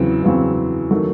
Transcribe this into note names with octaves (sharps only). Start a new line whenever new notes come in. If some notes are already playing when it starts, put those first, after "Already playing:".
Already playing: E2 C#3 F#3 C4
E2 C#3 F#3 C4
D#3 F#3 A3